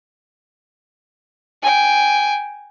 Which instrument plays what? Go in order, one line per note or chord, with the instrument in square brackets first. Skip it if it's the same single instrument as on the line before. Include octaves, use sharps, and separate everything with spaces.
[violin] G5 G#5